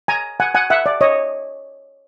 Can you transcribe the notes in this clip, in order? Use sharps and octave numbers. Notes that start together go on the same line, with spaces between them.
G#5 A#5
F#5 G#5
F#5 G#5
E5 F#5
D5
C#5 D#5